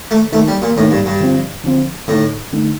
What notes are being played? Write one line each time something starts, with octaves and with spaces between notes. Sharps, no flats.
A3
D#3 A3 A#3 D#4
G3
A#2
A2 D#3 A#3 D#4
G2
G2
D3 F3 C4 F4
D3 F3 C4 F4
A2 D3 A3 D#4
D3 A3 D#4